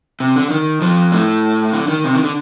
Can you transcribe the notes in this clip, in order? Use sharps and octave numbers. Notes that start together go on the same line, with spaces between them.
C3
D3
D#3
F2 F3
A2 A3
D3
D#3
C3
D#3
D3